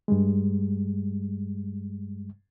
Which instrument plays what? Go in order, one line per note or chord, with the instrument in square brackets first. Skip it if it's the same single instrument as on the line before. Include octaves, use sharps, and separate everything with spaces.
[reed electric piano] G2 G3 G#3